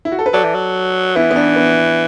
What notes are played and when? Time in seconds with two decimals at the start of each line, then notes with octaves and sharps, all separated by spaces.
0.05 E4
0.12 F#4
0.19 A4
0.26 B4
0.33 F#3 A4 D5
0.44 E3
0.55 F#3
1.16 E3 B3 E4
1.31 B3
1.36 D4
1.56 B3